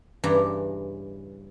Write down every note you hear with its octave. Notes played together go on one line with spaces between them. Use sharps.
G2 C#3 E3 A#5